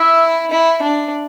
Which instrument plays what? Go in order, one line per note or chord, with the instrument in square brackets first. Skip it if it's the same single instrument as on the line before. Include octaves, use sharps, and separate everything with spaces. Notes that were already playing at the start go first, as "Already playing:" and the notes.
Already playing: [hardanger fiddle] E4 [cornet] E5
[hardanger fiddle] E4
D4